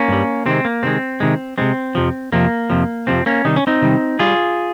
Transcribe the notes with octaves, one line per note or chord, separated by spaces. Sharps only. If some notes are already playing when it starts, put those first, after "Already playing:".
Already playing: A#3 C#4
G2 G3
C3 D#3 G#3 C4
A#3
C3 D#3 G#3 C4
C3 D#3 G#3
C3 D#3 G#3 C4
F2 C3 F3
F2 C3 F3 A#3
F2 C3 F3
F2 C3 F3 C4
A#3 C#4
C3 D#3 G3 D#4
C#4
C4 D#4
C3 D#3 G3
G3 F4 G#4